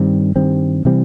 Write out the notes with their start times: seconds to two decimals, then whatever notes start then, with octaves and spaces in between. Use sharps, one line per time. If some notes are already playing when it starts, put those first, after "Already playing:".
Already playing: G2 D#3 G3 C4
0.36 G2 D#3 G3 C4
0.85 C3 E3 G3 C4